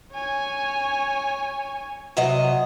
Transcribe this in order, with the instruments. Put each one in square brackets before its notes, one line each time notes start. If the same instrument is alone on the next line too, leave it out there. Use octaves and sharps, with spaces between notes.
[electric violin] C#5 G#5
[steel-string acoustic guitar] C3 F#3 D#5